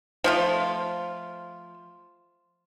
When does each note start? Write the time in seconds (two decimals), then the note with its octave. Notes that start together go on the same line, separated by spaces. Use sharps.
0.24 F3 A3 F4